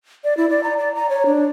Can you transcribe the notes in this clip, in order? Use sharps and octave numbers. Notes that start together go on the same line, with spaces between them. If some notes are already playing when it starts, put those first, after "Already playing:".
D5
E4
D5
A#5
D5
A#5
C#5
D4